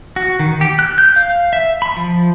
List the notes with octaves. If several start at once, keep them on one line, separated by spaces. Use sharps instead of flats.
F#4
D#3
G4
F#6
G6
F5
E5
B5
F3